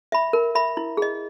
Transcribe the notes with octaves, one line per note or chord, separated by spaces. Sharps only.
E5 B5
A#4
E5 B5
E4
G#4 D#5